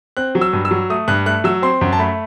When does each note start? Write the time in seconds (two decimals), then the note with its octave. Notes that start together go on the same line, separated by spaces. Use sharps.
0.17 C4 F#6
0.35 F#3
0.41 E6
0.53 G2
0.65 E6
0.71 F#3
0.90 A3 D#6
1.08 G2 F#6
1.26 A3 F#6
1.44 F#3 E6
1.62 C4 C6
1.81 F#2
1.93 A5
1.99 A3 B5